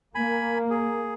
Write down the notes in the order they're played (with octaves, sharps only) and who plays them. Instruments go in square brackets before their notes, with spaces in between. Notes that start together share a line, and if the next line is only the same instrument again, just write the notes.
[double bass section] A#3 [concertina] G#5 B5
[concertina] G#4